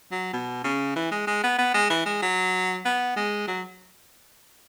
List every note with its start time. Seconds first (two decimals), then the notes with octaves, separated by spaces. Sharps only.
0.12 F#3
0.33 B2
0.64 C#3
0.96 E3
1.11 G#3
1.27 G#3
1.43 B3
1.58 B3
1.74 G#3
1.90 E3
2.06 G#3
2.22 F#3
2.85 B3
3.16 G#3
3.48 F#3